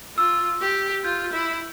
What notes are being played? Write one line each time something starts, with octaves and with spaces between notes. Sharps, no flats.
F4 E6
G4
F4 G6
E4